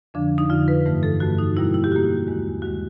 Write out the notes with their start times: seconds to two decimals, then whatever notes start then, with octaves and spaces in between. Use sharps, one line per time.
0.14 F2 D3 F3 D4
0.38 D#4
0.50 F2 D3 F3 F4
0.68 B4
0.85 G2 E3 A3
1.03 A4
1.20 G2 E3 A3 F#4
1.38 D#4
1.57 B2 G3 A#3 E4
1.74 E4
1.84 G4
1.92 B2 G3 A#3 F#4
2.27 D#2 D#3 G#3
2.62 D#2 D#3 G#3 F#4